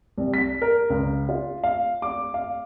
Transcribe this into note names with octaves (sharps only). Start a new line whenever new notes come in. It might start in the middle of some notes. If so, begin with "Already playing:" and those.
C2
B6
A#4
C#2
F4
F5
D6
F5